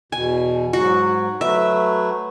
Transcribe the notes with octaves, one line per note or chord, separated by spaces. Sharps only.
E2 B2 G#5
G#2 F#3 F#4
F#3 A3 B4 E5